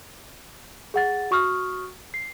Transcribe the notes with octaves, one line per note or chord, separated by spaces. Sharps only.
G#4 F#5 A6
F#4 C#6 D#6 F6
C7